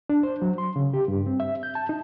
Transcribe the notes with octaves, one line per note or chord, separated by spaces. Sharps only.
D4
C5
F#3
C6
C#3
G4
G2
C4
E5
G6
A5
D#4